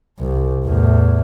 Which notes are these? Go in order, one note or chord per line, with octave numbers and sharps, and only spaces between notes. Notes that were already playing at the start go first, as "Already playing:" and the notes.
C2
E2 A2